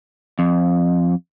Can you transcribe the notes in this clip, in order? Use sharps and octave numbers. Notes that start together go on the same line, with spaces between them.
F2